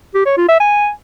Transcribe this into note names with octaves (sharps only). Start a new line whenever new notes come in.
G4
C#5
F4
E5
G#5